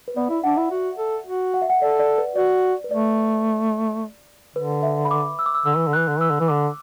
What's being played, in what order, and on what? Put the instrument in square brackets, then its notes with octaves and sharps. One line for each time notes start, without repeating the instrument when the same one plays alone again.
[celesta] B4
[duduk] B3 [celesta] D5
[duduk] E4 [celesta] E5
[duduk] D4 [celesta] F#5
[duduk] E4 [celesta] E5
[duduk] F#4
A4
F#4
[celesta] F#5
E5
F#5
[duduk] A4 [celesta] D5
[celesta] D5
B4
[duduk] F#4 [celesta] D5
[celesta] B4
[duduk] A3 [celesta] D5
[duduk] D3 [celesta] B4
[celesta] E5
B5
D6
E6
D6
E6
[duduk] D3 [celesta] E6
[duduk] E3
D3
[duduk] E3 [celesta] F#6
[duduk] D3
[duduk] E3 [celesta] E6
[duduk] D3
E3
[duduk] D3 [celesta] D6